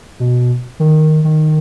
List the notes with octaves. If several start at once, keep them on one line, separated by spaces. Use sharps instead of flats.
B2
D#3
D#3